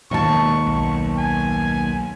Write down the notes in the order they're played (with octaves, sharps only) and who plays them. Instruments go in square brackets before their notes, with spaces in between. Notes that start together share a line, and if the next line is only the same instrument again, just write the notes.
[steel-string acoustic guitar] D#2 A5 [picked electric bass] B2 G#3 A#3 [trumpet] C#6
[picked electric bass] B1 [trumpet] C#6
[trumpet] G#5